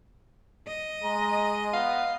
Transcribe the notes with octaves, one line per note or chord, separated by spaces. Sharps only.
D#5
G#3 A#5
B3 F5